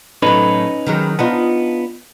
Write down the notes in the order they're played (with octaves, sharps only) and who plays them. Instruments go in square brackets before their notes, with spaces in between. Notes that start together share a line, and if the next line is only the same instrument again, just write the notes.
[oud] A2 F#3 [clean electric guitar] C#4 D#4 B4
[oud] D#3 F#3 G#3
[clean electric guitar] B3 [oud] D4 D#4 F4